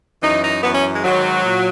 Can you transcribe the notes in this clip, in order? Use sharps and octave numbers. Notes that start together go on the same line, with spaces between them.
F#2 E3 D#4
D#4
F#2 E3 B3
C#4
G#3
G#2 D#3 F#3
A#2